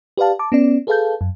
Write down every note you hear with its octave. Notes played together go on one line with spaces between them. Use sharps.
G4 B4 D5 F5 A5
A5 D6
B3 C#4 D5
G#4 A4 B4 F5 A5 G6
F#2